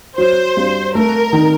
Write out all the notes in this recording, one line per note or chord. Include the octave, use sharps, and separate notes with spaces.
F#3 C5
G2
A3 A#4
D#3